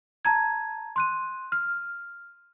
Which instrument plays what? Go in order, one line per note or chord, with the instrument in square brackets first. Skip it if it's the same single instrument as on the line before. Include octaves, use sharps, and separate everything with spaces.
[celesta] A5 A#5 G#6
C6 F#6 D#7
F6